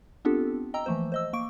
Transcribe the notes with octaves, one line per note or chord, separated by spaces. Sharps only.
B3 C4 D4 F4 G4 A4
D#5 G5 A#5 E6
E3 F3 A3 A#3 C5
C5 D#5 E6
A#3 C#6 D7